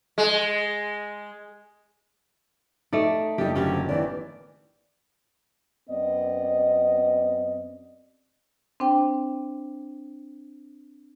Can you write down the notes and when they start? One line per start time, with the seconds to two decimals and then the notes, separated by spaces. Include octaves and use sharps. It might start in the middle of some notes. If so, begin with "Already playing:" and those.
0.18 G#3
2.93 A3 D#4 D5
3.38 F#1 G3 D4 D#4 G4
3.56 D3 F3 F#3 C#4 G4
3.89 D#3 E3 B3 D5
5.90 F#2 B3 C4 D5 D#5
8.80 C4 D4 C5 G5